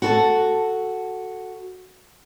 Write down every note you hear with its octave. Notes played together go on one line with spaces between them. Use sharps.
F#4 A4 A5